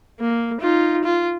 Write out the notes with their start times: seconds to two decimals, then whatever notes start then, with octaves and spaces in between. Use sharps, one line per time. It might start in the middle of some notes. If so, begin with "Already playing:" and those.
0.20 A#3
0.61 D#4 F4
1.04 F4